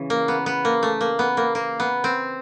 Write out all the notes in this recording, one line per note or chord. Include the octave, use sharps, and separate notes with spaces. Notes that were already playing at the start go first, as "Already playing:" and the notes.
Already playing: C#3 E3
A#3
B3
B3
A#3
A3
A#3
B3
A#3
A#3
B3
C4